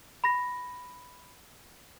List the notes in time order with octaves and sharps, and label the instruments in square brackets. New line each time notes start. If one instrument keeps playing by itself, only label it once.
[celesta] B5 A#6